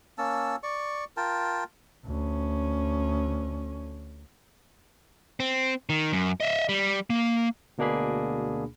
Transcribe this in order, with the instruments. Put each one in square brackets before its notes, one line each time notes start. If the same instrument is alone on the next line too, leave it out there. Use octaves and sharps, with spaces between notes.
[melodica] A#3 C#4 A5 E6
D5 C#6
F4 A#4 G5 A5
[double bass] D2 C#4
[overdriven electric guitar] C4
D#3
F#2
D#5 E5
G3
A#3
[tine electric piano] D2 B2 A#3 D4 G#4 B5